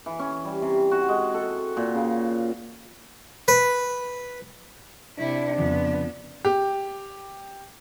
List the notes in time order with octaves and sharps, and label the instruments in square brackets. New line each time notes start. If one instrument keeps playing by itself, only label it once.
[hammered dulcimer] E3
C#4
G3
C3
F#4
G#3
A4
A#2
C#3
F5
[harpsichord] B4
[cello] C3 E4 [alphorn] D4
[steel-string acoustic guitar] F2 C#3 F3 [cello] B3
[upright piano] G4